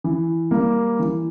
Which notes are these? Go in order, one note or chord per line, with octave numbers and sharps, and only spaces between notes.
E3
G3 A#3
E3